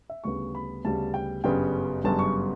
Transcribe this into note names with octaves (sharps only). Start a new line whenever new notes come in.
E5
D2 C#3 G3 B3 C#6
B5
D2 C#3 G3 B3 A5
G5
G1 F#2 C#3 G3 B3 G5
G1 F#2 C#3 G3 B3 A5
C#6